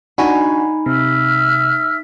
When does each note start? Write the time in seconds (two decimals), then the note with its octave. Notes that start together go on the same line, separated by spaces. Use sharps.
0.18 D4 D#4 F#4 G#5 B5
0.86 C3 E5 E6 F6